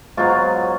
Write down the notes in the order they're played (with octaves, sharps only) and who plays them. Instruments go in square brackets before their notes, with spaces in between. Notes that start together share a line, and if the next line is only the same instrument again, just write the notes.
[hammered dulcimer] G#2 F#3 B3 F4